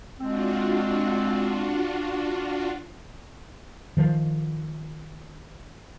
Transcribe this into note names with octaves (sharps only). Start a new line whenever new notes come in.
G#3 C4 D4 F4 F#4
D#3 F3